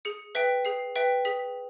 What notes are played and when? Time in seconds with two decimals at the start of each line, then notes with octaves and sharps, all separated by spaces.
0.05 G#4 C#7
0.35 B4 E5 G5
0.65 G#4 C7
0.96 B4 E5 G5
1.25 G#4 B6